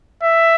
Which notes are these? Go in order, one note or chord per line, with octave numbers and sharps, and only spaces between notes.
E5